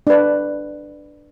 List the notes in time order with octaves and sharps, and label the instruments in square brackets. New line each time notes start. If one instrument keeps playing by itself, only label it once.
[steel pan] D4 B4